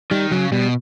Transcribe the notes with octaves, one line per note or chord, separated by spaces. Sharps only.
D#3 G3
C#3 F#3
B2 G3